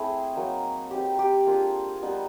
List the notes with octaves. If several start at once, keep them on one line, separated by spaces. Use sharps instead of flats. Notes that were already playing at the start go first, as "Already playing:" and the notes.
Already playing: A3 C4 E4 G#4
F#3 A#3 D#4
G#3 C4 D#4 G4
G4
A#3 D4 F4 G#4
G3 B3 D#4